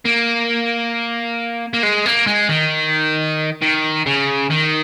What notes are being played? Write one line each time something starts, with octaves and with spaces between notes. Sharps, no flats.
A#3
A#3
G#3
A#3
G#3
D#3
D#3
C#3
D#3